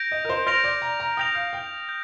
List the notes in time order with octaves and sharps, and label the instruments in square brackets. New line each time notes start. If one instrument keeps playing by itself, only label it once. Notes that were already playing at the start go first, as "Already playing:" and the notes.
Already playing: [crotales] G6 A#6 D7 F7
[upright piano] D#5
A#4
C5
[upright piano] C5 [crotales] F6 A#6 D7 F7
[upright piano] D5
A#5
A#5
[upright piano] G5 [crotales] D#6 G6 A#6 F7
[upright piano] F5
G5
[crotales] G6